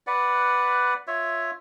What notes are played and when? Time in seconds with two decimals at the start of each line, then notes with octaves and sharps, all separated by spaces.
0.07 B4 D5 F#5
1.07 F4 C#5 E5